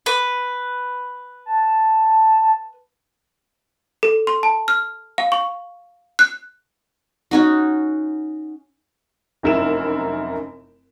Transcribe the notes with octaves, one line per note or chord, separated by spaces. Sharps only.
B4
A5
A4
C6
A5
F6
F5
C#6
F#6
C#4 D#4 F#4
F1 F#2 E4 A#4 E7